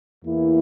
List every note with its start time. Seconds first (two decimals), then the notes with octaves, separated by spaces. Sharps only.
0.23 E2 E3 A#3 E4